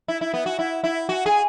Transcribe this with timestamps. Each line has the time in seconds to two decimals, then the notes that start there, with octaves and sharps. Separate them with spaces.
0.08 E4
0.21 E4
0.34 B3
0.46 F#4
0.59 E4
0.84 E4
1.09 F#4
1.26 G#4